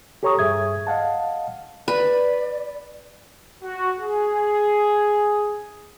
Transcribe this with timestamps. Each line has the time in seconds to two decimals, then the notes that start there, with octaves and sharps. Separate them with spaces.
0.23 G4 A4 C#5 A#5 C#6 D#6
0.39 G2 G#4 E5 D#6 G#6
0.87 D#5 F5 F#5 A5
1.88 B4 D5
3.63 F#4
3.99 G#4